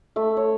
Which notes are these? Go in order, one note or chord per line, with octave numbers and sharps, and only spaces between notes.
A3 E5
C#5